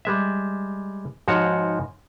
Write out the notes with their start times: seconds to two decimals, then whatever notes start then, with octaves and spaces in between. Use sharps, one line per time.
0.05 G3 G#3 E5
1.28 G#2 F3 F#4 C#5